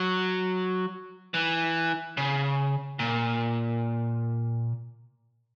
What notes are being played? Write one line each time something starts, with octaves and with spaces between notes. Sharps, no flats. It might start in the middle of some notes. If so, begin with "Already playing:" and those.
Already playing: F#3
E3
C#3
A#2